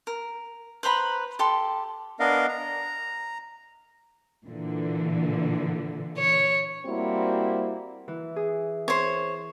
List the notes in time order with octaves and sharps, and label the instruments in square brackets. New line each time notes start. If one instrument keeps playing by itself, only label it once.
[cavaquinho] A#4
B4 C5 A#5 B5
G4 A4 C6
[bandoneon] B3 D4 A#4 D#5 F5
A#5
[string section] A#2 D3 E3
[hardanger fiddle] C#5
[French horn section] G3 A#3 C4 E4 F#4
[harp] E3
G#4
[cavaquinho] C5 C#5